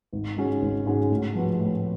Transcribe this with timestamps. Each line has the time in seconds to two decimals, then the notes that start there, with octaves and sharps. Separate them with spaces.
0.13 G#1
0.37 G#2 G#3 C#4 F#4
0.62 G#1
0.86 G#2 G#3 C#4 F#4
1.11 A2
1.35 F3 B3 F#4
1.60 A2